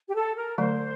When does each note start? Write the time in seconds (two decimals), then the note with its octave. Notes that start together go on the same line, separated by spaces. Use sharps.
0.08 G4
0.14 A4
0.36 A#4
0.58 D3 F#3 A3 C5